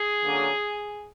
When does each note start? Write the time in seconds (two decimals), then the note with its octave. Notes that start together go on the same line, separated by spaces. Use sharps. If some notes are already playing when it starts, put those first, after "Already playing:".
Already playing: G#4
0.22 D3 F#3 A#3 C#4